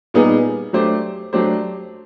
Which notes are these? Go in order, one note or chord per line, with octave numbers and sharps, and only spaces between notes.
A#2 G3 B3 D#4 G#4
F#3 A3 D4 G4 C5
F#3 A3 D4 G4 C5